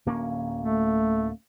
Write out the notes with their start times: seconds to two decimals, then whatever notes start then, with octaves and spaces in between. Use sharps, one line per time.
0.06 D1 A#3 C#4
0.61 A3